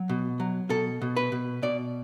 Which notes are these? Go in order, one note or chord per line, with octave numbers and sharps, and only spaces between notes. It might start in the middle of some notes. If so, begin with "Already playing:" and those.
Already playing: F#3
B2
F#3
B2 A4
B2
B4
B2
B2 D5